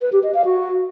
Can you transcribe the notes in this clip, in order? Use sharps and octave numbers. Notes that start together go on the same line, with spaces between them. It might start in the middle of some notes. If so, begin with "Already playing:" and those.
B4
G4
D#5
F5
F#4